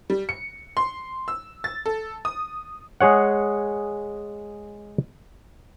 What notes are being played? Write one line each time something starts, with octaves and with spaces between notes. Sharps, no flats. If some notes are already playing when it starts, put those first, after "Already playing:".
G3
C#7
C6
E6
A6
A4
D#6
G#3 G#4 C#5 F#5